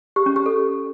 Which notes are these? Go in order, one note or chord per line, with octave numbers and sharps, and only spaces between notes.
G4
C#4
G4
A4